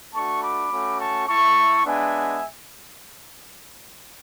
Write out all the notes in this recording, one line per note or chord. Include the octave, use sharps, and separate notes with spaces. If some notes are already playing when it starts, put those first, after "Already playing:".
A3 D4 F#4 A5 C#6
B5 D6
A3 C#4 F#4
A5 C#6
A3 E4 A5 C#6
G#3 B3 D4 E5 G#5